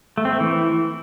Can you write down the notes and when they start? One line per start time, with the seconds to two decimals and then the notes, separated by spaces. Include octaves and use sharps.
0.18 A3
0.25 C4
0.33 A3
0.40 E3